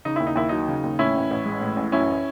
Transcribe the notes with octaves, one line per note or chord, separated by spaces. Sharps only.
C#3 D#4
D#2 E4
D#4
D#2 E4
F#3 D#4
C#3
D#2
A2 C#4 E4
A1
A1
G#3
A2
A1
F#2 C#4 E4